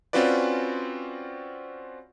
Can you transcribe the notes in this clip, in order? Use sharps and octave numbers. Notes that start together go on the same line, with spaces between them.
C4 C#4 F4 F#4 B4 D5